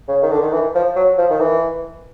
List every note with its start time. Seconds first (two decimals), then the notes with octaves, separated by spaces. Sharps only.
0.08 C#3
0.22 D#3
0.31 D3
0.42 D#3
0.52 E3
0.75 F3
0.96 F#3
1.18 F3
1.30 D#3
1.40 E3